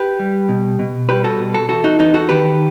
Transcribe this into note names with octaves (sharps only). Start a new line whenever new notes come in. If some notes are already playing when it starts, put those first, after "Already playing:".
Already playing: G4 B4
G3
B2
B2
G3 G4 B4
F#4 A4
B2
F#4 A4
E2 F#4 A4
D#4 F#4
E2 B3 D#4
F#4 A4
D#3 G4 B4